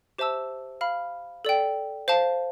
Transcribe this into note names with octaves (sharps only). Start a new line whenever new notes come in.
G4 C5 E5 A5 E6
F5 B5 F6
A4 D5 G5
C5 F5 A5